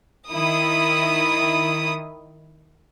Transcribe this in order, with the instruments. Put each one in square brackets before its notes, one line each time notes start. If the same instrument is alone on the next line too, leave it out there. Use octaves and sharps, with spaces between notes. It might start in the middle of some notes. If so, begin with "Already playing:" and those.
[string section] D#3 E4 D#6